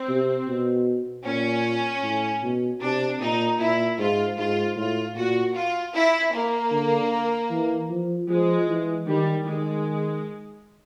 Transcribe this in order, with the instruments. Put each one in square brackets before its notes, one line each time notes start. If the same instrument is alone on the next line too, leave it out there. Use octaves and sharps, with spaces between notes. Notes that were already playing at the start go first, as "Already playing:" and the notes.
Already playing: [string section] C4
[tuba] C3
B2
[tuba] A#2 [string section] C#4
[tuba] A2
B2
[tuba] C3 [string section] D4
[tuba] A#2 [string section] D#4
[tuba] A#2 [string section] E4
[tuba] G#2 [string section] F4
[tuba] G#2 [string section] F4
[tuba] A2 [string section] F4
[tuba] A#2 [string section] F#4
[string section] F4
E4
A#3
[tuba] D3
E3
F3
[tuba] F3 [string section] G#3
[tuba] E3
[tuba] D#3 [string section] G3
[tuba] D#3 [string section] G#3